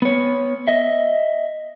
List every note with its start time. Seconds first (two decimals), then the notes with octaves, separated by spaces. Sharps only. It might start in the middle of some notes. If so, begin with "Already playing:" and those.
0.02 B3 C#5
0.68 D#5 E5